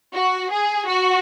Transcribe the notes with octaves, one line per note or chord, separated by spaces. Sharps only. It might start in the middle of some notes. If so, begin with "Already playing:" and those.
F#4
G#4
F#4